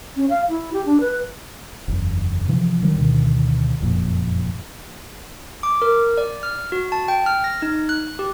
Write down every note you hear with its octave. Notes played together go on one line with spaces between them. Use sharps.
C#4
F5
E4
G4
D4
B4
F#1 E2
C3 E3 F3
D#3 F#3 G3
D2 B2 D#3
F#1 F2 A#2
D6
A#4
D5
F6
F#4
A5
G5
F6
A#6
D#4
F#6
G4